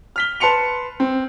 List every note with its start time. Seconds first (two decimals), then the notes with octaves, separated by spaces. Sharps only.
0.16 F6 B6 G7
0.40 B4 A5 C6 C#7 F7
1.00 C4